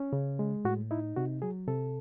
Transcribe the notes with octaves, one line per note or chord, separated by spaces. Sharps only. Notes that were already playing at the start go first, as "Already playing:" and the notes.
Already playing: C#4
C#3
G#3
A2 F#4
D#4 E4
C3 F#4
F#3 G#4
C3 A4